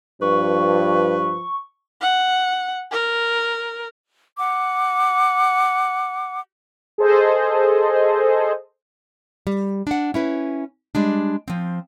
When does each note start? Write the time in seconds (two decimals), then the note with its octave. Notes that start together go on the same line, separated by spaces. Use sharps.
0.22 G2 F3 B4 C#6
2.01 F#5
2.91 A#4
4.38 F#5 D6
6.98 G#4 A4 C5 D#5
9.47 G3
9.87 D4 F#5
10.14 C#4 E4 B4
10.95 G3 G#3 D4
11.48 F3 C4